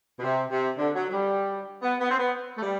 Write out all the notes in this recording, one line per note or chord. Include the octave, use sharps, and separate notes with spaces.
B2
C3
C3
D3
F#3
F#3
G3
B3
B3
C4
B3
A3
G3